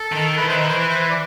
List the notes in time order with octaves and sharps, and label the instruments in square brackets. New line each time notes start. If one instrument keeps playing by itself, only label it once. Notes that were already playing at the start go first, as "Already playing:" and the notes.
Already playing: [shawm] A4
[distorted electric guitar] D#3
[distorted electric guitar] E3 [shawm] B4
[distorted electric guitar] D#3 [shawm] C5
[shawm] B4
[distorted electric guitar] E3 [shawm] C5
[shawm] B4
C5
B4
D5